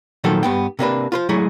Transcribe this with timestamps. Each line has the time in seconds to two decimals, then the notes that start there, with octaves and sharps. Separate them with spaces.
0.24 A#2 D#3 F3 F#3 A3 A4
0.43 G2 B3 G5
0.79 C3 A#3 D4 B4
1.12 F4 B4 C5
1.29 F#3 G#3 A3 E4 G#4